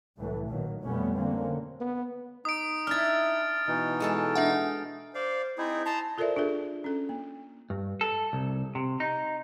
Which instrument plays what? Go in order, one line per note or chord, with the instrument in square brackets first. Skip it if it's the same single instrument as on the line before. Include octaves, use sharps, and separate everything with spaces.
[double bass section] C2 A2 E3 F#3 A3
A#1 A#2 D#3 F#3 A#3
F2 B2 G3 A3 B3 C#4
D3 A#3 C4 C#4
[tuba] B3
[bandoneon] D#4 [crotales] D#6 D7
[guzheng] D4 E4 [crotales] F6 A6
[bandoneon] B2 E3 D#4
[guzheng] G#3 A4 A5
[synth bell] D4 E5 F#5
[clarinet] C5 [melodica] D5 F5
[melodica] C4 D#4 G#4 [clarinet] E4
[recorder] A5 [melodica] A#5 C6
[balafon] F4 A4 A#4 C5 D5 E5
D4 F4 G#4 A4
C#4 A4
A#3
[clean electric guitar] G2
A4
C2
C3
D#4